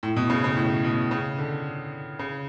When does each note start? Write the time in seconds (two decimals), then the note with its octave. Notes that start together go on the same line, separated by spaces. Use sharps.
0.03 A2
0.16 B2
0.30 C#3
0.44 C#3
0.57 A2
0.84 B2
1.11 C#3
1.38 D3
2.19 C#3